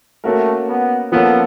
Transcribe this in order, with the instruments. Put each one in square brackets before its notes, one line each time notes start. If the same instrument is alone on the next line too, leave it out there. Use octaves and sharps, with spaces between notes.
[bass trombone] A3 [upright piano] A#3 C#4 F#4 A#4
[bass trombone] B3
[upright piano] F3 A#3 C#4 F4 A4 [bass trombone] B3